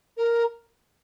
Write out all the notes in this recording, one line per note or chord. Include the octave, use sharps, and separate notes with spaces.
A#4